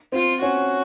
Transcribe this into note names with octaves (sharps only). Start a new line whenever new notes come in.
C4 F4
C#4 F#4